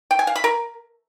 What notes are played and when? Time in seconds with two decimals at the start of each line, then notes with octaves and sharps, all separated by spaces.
0.11 G5
0.19 G#5
0.27 F5
0.36 B5
0.44 A#4